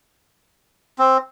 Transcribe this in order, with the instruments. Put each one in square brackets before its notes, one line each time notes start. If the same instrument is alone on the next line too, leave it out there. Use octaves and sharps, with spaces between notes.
[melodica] C4